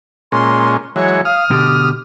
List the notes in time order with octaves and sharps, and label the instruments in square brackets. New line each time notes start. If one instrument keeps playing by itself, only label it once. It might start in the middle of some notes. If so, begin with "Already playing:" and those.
[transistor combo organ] A#2 G#3 C#4 [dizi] C6
[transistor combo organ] E3 F#3 G#3 [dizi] C#5
[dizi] F5 [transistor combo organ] D#6 F6
[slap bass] B2 D3 [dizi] G4